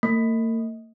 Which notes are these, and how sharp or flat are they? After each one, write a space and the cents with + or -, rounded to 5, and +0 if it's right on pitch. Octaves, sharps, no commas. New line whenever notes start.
A#3 -45